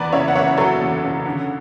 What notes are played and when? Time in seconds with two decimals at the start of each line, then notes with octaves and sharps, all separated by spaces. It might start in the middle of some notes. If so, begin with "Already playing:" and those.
Already playing: E2 B4 D5
0.12 C#3 C#5 E5
0.28 F#5
0.35 F#1 C#5 E5
0.58 F#3 A4 C#5
0.81 E2
1.03 C#3
1.26 D3